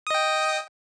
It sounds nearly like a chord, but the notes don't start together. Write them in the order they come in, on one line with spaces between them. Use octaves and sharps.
D#6 D#5 G5